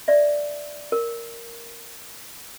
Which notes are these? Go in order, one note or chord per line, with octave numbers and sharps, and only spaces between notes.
D5 E5
A#4